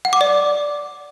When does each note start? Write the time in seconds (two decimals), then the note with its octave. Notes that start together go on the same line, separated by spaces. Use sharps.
0.05 F#5
0.13 D6
0.21 D5